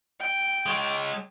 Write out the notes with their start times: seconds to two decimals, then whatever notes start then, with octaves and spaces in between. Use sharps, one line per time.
0.20 G5
0.66 G#3 C#5